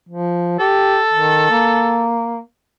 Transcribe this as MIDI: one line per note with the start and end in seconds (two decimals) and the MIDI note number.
0.09 0.55 53
0.60 0.99 67
0.60 2.09 69
1.13 1.47 51
1.50 2.41 58